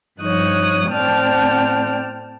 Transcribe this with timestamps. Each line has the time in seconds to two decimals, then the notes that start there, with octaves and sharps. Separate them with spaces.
0.21 G2 F3 D#4 C#5 D#6 F#6
0.90 A2 C4 D5 G5 A5 F6